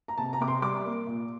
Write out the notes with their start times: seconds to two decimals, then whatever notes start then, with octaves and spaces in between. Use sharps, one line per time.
0.08 A#5
0.18 C3 A5
0.33 A#5
0.40 C3 D6
0.48 C6
0.62 G3 D6
0.85 A#3
1.07 A#2